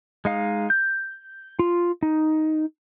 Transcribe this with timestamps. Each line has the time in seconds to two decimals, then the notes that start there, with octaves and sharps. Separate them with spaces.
0.25 G#3 D#4 F5
0.70 G6
1.59 F4
2.03 D#4